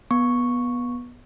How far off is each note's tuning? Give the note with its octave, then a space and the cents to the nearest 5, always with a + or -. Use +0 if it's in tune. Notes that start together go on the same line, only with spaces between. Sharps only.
B3 -15 C#6 +0